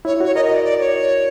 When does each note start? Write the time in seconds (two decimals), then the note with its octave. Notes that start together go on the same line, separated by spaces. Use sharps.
0.05 E4 C#5
0.20 F#4 C#5
0.35 A#4 D#5
0.45 D#5
0.54 D5
0.64 D5
0.80 C#5